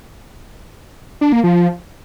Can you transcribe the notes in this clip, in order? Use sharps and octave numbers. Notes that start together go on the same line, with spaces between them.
D4
A#3
F3